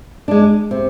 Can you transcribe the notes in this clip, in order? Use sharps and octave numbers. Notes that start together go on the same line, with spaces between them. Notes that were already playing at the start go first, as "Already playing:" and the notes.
G#3 D4
C3